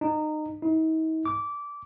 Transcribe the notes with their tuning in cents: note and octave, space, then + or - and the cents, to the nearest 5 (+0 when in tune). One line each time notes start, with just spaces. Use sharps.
D#4 -20
D#4 +45
D6 -20